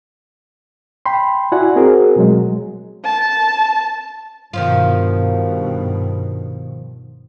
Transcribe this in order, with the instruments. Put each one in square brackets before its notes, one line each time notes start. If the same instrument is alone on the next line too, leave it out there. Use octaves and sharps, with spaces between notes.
[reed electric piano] G5 B5 C6
E4 F#4 D5 F#5 G#5
C4 F#4 G#4 A#4
B2 F#3 G#3
[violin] A5
[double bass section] G2 B2 [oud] D#3 F3 F4